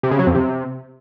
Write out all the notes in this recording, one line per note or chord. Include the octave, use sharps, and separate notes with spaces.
C3
C#3
F#3
F2
C3